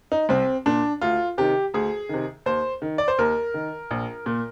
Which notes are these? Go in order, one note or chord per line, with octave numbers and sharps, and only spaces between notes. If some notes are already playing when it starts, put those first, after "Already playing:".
D#4
C2 C4
A#2 D4
D2 F4
C3 D#3 G4
D2 G#4
C3 D#3
D#2 C5
D#3
D5
C5
D#2 A#4
D#3
A#1
A#2